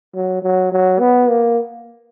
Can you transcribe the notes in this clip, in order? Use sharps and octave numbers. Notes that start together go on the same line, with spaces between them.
F#3
F#3
F#3
B3
A#3